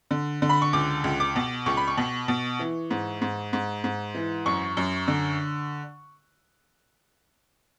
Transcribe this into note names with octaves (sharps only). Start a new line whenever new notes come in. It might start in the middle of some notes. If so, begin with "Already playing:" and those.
D3
D3
B5
C#6
C#2 D6
C#2
D6
B2
C#2 C#6
B5
C#6
B2
B2
E3
G#2
G#2
G#2
G#2
E3
F#2 C#6
F#2
D3